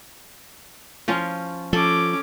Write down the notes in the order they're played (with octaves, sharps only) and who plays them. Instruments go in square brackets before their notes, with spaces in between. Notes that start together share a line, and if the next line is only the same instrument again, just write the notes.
[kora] F3 C#4 F4
[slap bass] F3 [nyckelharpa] C#4 D6 [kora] A4